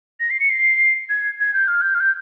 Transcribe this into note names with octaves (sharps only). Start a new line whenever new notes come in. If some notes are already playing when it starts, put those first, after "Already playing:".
A#6
C7
C#7
C7
G#6
G#6
G6
F6
G6
F6
G6